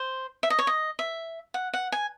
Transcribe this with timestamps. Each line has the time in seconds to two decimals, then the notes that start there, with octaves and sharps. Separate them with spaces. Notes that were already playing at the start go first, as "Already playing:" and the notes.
Already playing: C5
0.43 E5
0.50 D#5
0.59 C#5
0.67 D#5
0.99 E5
1.54 F#5
1.74 F#5
1.92 G#5